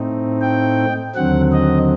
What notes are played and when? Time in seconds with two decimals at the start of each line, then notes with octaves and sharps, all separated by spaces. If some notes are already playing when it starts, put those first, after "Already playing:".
Already playing: A2 A3 C4 D#4
0.41 G5
1.15 D#2 D3 F#3 C4 F#5
1.53 D#5